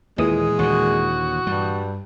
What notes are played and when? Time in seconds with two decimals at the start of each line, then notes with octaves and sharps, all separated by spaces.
0.18 D#2 A#2 E3 G#3 D#6
0.59 D#2 D3 F#4
1.47 G2 G3